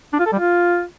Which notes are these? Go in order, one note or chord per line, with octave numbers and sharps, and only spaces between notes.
D4
F4
A4
G3
F4